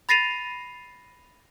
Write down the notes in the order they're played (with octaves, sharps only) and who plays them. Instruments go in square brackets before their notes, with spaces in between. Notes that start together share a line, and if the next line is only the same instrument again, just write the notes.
[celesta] B5 A6 A#6 C7 D#7 F7